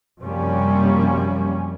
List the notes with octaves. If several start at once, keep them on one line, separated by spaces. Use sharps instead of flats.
F#2 C3 F3 G3 A#3 C#4